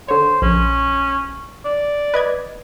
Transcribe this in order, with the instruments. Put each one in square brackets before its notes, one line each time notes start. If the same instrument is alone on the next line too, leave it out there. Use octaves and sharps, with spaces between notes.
[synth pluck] D3 C#5 [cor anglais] C5
[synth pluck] A#1 [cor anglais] C#4
[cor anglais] D5
[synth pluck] B4 D#5 G#6